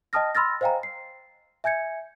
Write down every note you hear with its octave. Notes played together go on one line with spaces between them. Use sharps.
D#5 G5 A5 D#6 F6 A#6
B5 C6 E6 F6 A6 A#6
C5 D#5 F5 G5 G#5 A#5
C7
E5 G#5 G6 G#6 C#7